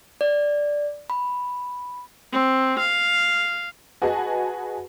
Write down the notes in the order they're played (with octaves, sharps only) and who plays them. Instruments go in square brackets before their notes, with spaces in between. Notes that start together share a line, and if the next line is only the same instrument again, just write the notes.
[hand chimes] D5
B5
[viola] C4
F5
[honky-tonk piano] F#4 G#4 B4 D#5 G#5 A5